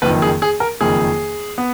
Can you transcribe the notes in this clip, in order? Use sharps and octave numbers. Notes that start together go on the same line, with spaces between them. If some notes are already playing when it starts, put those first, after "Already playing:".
F#1 F2 D#3 B4
G#4
G#4
A#4
F#1 F2 D#3 G#4
B3